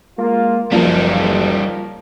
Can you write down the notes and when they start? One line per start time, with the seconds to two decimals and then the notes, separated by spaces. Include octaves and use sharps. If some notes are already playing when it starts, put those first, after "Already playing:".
0.19 G#3 A#3 F4
0.72 F#1 C#2 F3 G3 A#3 D#4